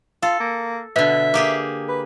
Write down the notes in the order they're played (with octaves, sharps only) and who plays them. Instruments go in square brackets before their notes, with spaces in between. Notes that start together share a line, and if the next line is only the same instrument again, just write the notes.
[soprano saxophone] F4 [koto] A4
[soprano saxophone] A#3
[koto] B2 D3 [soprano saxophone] E5
[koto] A#3 G4 G#4
[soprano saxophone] B4